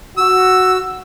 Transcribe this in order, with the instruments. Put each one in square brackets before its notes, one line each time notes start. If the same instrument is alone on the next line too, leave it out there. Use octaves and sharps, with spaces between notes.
[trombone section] F#4 [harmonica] E6